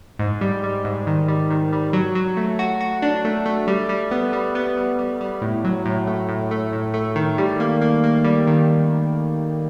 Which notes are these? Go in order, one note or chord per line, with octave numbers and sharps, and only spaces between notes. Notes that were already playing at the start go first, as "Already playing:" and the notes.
G#2
G3
G3
G#2
D#3
G3
D#3
G3
F#3
F#3
A3
F#4
F#4
D4
A3
A3
G3
G3
B3
G3
B3
G3
G3
G3
A2
F#3
A2
A3
A2
A3
A2
A3
D#3
G3
A#3
A#3
A#3
G3
D#3